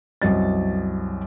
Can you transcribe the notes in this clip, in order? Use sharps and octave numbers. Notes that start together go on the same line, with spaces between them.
C2 F#2 D#5 A6